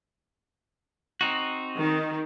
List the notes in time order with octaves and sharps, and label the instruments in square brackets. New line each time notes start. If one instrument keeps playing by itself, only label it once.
[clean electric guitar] C4 D#4 F#4
[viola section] D#3